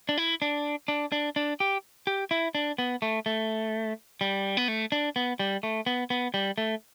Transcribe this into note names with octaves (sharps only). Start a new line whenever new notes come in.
D4
E4
D4
D4
D4
D4
G4
G4
E4
D4
B3
A3
A3
G3
B3
A3
D4
B3
G3
A3
B3
B3
G3
A3